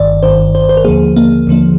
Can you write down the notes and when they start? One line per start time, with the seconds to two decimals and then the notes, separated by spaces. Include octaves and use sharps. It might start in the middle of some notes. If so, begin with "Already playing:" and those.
Already playing: G1 G2 D#3 D5
0.23 G1 G2 D#3 C5
0.55 C5
0.69 C5
0.77 A#4
0.84 D#2 D3 F3 A#3 G#4
1.17 A#3
1.47 D#2 D3 F3 A#3